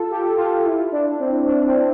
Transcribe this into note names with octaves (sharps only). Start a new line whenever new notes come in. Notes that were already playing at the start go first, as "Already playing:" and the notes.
Already playing: F4 A4
G4
F4
E4
D4
C4
D4
C4